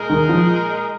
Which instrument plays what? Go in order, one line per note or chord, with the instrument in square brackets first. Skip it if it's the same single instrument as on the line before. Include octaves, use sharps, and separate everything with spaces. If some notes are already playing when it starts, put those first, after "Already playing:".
Already playing: [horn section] A#2 G#3 D#4 A#4
[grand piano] D#3
F3